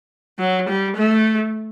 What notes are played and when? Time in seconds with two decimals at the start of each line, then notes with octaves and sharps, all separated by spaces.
0.39 F#3
0.68 G3
0.96 A3